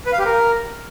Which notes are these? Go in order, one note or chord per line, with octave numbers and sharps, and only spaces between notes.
B4
F5
G4
A#4